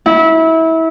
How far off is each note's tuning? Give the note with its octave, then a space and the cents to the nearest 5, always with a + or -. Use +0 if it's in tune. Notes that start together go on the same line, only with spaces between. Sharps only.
E4 -25